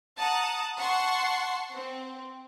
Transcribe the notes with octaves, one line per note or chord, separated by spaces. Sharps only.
F#5 A5 A#5 D#6
F#5 A5 C6 C#6
C4